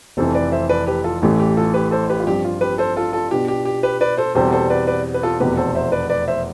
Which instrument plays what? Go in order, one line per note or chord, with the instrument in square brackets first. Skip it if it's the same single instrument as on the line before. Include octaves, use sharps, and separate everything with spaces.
[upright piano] F1 F2 E3 [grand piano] A4 C5
[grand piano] B4 D5
C5 E5
B4 D5
G4 B4
F4 A4
[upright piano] A1 A2 E3 A3 [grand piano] G4
[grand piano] G4
F4 A4
G4 B4
A4 C5
G4 B4
F4
[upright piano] G2 F3 C4 [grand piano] G4
[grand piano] F4
G4 B4
A4 C5
F4 A4
F4 A4
[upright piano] B2 B3 D4 F4 [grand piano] G4
[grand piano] G4
G4
G4 B4
B4 D5
A4 C5
[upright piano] E2 B2 G3 C4 G4 [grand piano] A4 C5
[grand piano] A4 C5
B4 D5
B4 D5
B4
F4 A4
[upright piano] F1 E2 B2 [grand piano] G4 B4
[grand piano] A4 C5
C5 E5
B4 D5
B4 D5
C5 E5